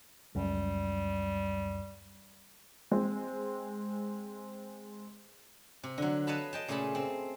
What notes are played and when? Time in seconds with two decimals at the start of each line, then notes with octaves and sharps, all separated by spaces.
0.35 C#2 F#2 G3
2.91 G#3 C4
5.83 C3
5.98 D3 F#3
6.27 B4 C#5 D#5 F5 A5 B5
6.53 D#5 G5 A5
6.68 A#2 C#3 A3 G#4 A5 B5
6.95 C4